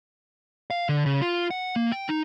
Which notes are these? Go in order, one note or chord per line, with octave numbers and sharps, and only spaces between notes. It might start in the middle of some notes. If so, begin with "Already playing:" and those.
F5
D3
C#3
F4
F#5
A#3
G5
D#4